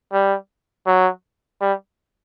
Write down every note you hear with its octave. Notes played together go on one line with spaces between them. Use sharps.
G3
F#3
G3